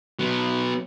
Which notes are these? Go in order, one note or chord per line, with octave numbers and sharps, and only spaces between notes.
F#3 B3